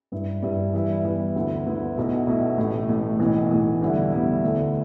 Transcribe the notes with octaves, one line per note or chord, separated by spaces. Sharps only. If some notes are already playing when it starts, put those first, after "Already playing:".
G2 G3 E4
G2 G3 E4
E2 E3 G3 B3 E4
E2 E3 G3 B3 E4
D2 D3 B3 E4
D2 D3 B3 E4
B1 B2 A3 E4
B1 B2 A3 E4
A1 A2 A3
A1 A2 A3
B1 A2 E3
B1 A2 E3
E2 D3 G3 E4
E2 D3 G3 E4
D2 D3 A3 E4